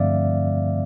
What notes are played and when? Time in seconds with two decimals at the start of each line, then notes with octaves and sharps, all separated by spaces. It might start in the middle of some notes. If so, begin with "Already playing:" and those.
Already playing: G2 D3 F3 A3 C4 D5 E5 F5